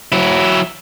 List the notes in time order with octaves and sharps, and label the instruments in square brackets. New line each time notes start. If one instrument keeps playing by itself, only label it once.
[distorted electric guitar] F#3 E4